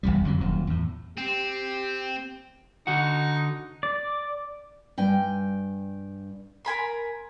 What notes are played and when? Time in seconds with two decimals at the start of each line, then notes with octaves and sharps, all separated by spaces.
0.03 F1 B1 E2 G3
0.25 F2 D3 F#3
0.41 D#1 F#2 A#2
0.67 E2 A2
1.18 C4 G4
2.87 D3 D#4 F#4 F#5
3.83 D5
4.98 G2 G5 G#5
6.65 A#4 G#5 B5 C6